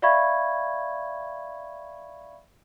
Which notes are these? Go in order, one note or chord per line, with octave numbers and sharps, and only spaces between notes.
D5 E5 F5 B5 C#6 G#6